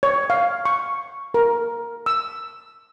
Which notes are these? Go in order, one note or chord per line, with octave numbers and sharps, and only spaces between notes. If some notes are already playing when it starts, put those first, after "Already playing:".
C#5
F5
C#6
A#4
E6